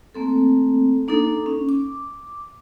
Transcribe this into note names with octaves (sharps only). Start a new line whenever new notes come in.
A3 A#3 C4 A4
A#3 D4 D#4 A4
C#4
D6